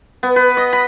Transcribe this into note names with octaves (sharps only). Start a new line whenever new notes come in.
B3
B4
D#5
B5